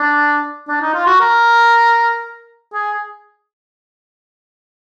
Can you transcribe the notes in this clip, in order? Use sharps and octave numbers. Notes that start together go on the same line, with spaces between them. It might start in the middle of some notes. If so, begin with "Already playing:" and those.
Already playing: D4
D4
D#4
F4
F#4
A#4
G#4